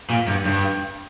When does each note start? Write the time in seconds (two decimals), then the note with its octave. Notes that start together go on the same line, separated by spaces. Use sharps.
0.10 A#2
0.27 G2
0.45 G2